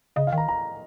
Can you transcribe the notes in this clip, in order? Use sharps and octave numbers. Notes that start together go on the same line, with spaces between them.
C#3 D#5
F5
D#3 A#5
A#5